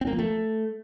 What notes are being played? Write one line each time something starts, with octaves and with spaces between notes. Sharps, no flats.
C4
A#3
F3
A3